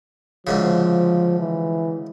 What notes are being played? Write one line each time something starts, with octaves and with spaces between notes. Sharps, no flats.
D2 G#2 C#3 F3
E3